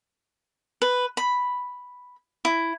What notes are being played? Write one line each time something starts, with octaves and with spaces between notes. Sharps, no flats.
B4
B5
E4